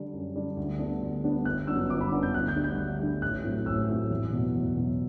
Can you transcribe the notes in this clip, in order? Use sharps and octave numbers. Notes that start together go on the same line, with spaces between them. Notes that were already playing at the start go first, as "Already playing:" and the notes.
Already playing: D3 G3 D4
F#2
D3 G3 D4
D2
D3 G3 B3 D4
D2
D3 G3 B3 D4
G1 F#6
F#2 F#3 B3 D4 E6
G1 D6
B5
F#2 F#3 B3 D4
G6
D2 F#6
G6
D3 G3
G6
D2
D3 G3
A1 F#6
A2 F#3 C4
A1 E6
A2 F#3 C4
E2
B2 F#3 B3
E2
B2 F#3 B3